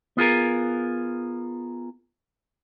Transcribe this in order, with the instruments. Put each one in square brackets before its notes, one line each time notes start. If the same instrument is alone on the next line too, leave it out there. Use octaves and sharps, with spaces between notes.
[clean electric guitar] B3 F4 G#4 A#4